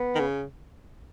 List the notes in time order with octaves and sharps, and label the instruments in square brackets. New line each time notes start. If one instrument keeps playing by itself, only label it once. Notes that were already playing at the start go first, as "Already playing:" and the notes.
Already playing: [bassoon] B3
[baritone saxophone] D#3
C#3